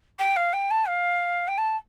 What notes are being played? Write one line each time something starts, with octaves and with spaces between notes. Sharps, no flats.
G5
F5
G5
A5
F5
G5
A5